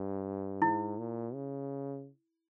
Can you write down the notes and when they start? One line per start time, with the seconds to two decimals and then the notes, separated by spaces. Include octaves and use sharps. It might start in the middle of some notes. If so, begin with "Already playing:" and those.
Already playing: G2
0.62 G#2 E4
0.98 A#2
1.34 C#3